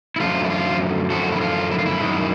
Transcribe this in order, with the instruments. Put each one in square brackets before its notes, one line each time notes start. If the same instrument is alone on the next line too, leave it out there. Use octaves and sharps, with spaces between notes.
[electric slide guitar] E4
F#2 D3 F3 A3 F4
E4
F4
F#2 D3 F3 A3 F#4
E4
F4
E4
F4
E4
F#2 D#3 G#3